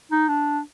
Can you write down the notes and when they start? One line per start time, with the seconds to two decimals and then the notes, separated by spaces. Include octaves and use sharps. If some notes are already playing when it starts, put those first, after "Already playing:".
0.11 D#4
0.29 D4